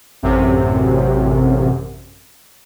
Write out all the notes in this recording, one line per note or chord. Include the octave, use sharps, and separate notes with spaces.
A1 F#2 C3